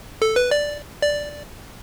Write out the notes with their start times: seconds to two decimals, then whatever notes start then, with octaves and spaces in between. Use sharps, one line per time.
0.22 A4
0.36 B4
0.51 D5
1.01 D5